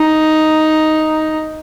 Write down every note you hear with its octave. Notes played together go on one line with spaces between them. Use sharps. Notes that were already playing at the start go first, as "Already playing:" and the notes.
Already playing: D#4